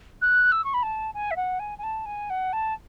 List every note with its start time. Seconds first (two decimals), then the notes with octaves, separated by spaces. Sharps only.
0.21 F#6
0.51 E6
0.64 C#6
0.74 B5
0.82 A5
1.14 G#5
1.31 E5
1.36 F#5
1.59 G#5
1.78 G#5
1.83 A5
2.05 G#5
2.30 F#5
2.53 A5